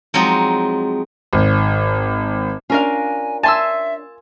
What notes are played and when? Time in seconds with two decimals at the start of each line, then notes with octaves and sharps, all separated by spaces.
0.14 F3 F#3 G#3 C4 D#4
1.33 G#1
2.70 C#4 D4 F4 A#4 F5 G#5
3.43 E5 G#5 A5 C6 E6